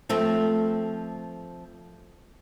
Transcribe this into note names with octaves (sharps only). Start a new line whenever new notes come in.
F3 A3 C4